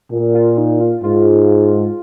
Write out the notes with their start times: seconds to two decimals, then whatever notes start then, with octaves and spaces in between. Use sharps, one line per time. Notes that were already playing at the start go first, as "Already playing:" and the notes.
0.11 A#2
0.34 F4
0.58 D#4
0.81 F4
1.03 G#2 F4